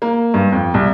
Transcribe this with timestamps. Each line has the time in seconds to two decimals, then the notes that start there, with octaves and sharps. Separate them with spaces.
0.02 A#3
0.34 G2
0.52 F2
0.74 C2